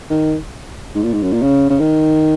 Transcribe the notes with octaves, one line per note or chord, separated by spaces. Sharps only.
D#3
G#2
A#2
G#2
F#2
A#2
C#3
C#3
D#3